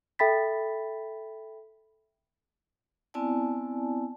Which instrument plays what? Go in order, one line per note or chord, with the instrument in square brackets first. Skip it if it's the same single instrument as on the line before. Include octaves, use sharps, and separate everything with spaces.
[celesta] A4 E5 G5 B5 A6 B6
[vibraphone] B3 C4 E4 D5 G#5 A5